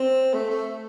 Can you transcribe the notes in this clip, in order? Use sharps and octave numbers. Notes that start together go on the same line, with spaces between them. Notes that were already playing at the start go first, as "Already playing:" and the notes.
Already playing: C4
A3
A3